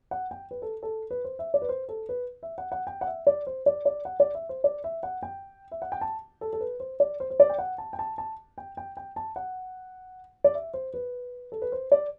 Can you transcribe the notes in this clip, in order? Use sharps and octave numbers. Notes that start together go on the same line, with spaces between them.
F#5
G5
B4
A4
A4
B4
C5
E5
D5
B4
C5
A4
B4
E5
F#5
F#5
G5
F#5
E5
D5
C5
D5
D5
F#5
D5
E5
C5
D5
E5
F#5
G5
E5
F#5
G5
A5
A4
A4
B4
C5
D5
C5
C5
D5
G5
F#5
A5
G5
A5
A5
G5
G5
G5
A5
F#5
D5
E5
C5
B4
A4
B4
C5
D5